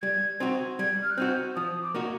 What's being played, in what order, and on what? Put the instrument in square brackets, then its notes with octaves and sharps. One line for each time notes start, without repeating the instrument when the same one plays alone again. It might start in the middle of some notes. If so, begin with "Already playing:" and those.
[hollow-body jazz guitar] G3 [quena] G#6
[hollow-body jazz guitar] C4 D#4 F#4
[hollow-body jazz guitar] G3 [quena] G#6
[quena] F6
F#6
[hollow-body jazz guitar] C4 D#4 F#4 [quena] G6
[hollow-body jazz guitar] F3 [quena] D#6
[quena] D6
[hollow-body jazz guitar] A#3 D#4 F#4